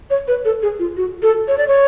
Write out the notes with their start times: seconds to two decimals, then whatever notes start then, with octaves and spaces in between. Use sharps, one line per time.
0.10 C#5
0.28 B4
0.45 A4
0.63 G#4
0.79 F4
0.97 F#4
1.23 A4
1.48 C#5
1.58 D5
1.68 C#5